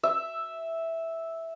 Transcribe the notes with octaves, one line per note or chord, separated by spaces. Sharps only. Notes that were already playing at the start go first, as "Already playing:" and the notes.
E5